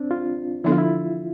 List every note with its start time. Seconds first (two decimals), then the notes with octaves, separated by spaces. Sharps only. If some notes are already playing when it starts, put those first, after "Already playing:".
Already playing: C4 D4
0.11 F4
0.64 D3 F3 B3 D4 E4 A4
0.72 F4
0.78 E4